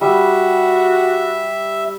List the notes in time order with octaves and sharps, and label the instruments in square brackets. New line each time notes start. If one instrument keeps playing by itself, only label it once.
[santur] G3 [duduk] F#4 [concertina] E5